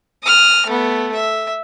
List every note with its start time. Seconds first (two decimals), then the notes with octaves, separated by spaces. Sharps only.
0.23 D#6 F6
0.66 A3 B3
1.14 E5